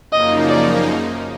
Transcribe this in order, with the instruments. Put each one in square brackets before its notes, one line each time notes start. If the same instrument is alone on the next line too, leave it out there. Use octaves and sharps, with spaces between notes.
[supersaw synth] F#2 C#3 F3 A#3 D#4 [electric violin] D#5
[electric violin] D5